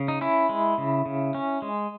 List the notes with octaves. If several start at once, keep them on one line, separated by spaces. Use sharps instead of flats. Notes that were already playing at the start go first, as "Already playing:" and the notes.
Already playing: C#3
D#4
C#4 E4
G#3
C#3
C#3
C#4
G#3